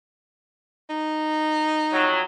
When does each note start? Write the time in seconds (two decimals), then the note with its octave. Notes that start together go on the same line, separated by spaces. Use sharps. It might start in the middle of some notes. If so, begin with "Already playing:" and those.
0.90 D#4
1.92 F2 F#3